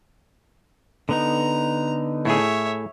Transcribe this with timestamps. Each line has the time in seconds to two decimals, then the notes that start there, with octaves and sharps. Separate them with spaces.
1.09 D3 B3 D#4 A#5
2.25 A2 A3 G#4 C#5 E5